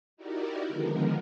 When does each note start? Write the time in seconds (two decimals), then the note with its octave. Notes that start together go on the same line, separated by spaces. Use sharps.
0.17 D#4 E4 F#4 G4 A#4 D5
0.69 D3 D#3 F3 G#3 B3 A#4